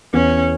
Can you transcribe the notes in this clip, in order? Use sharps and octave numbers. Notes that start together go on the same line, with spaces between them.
E2 C#4